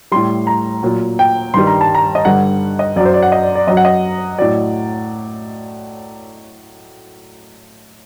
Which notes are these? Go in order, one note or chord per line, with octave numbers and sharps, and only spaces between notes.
A2 G3 C6
A#5
A#2 F#3
G5
G2 D#3 G3 C6
A#5
A5
A#5
D#5
G2 D3 G3 F#5
D#5
F#2 F#3 D5
C5
D5
F#5
D#5
D5
D5
F#2 F#3 D#5
F#5
D#5
A2 F#3 D5